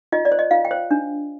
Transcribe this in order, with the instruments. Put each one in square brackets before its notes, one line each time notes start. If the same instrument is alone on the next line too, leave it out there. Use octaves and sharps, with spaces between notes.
[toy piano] F4 D#5
D5
C5
D#5
F4 F5
G5
C5
D4